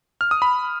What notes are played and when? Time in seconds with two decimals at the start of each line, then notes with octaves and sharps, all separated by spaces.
0.21 F6
0.31 D#6
0.42 B5